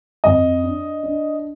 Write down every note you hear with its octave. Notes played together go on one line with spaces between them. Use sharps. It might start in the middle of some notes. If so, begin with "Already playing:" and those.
F2 D#5
D4
D4